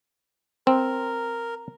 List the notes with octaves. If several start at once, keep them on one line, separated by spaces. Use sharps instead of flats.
C4 A#4